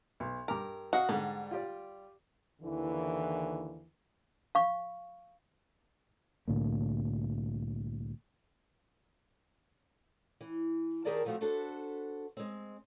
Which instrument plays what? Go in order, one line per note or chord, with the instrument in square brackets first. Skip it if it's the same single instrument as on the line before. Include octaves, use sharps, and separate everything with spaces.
[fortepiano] B1
[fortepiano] G2 D6 [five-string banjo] A#4
[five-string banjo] F#4 [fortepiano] D#5 F5 F#5
[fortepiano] G#2 D3 [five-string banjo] G3
[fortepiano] F4 G4 D5
[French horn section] D#2 D3 E3
[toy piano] F5 C#6
[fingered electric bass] C2 A2 D3 A#3
[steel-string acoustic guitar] E3
D#3 G4 G#4 A#4 D5 A5
D2 F3 A3 C4 F4 F#4
D4 F#4 A4 B4 C5
G#3 C4